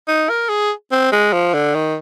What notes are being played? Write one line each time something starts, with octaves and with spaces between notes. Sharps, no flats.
D#4
A#4
G#4
C4
G#3
F3
D3
D#3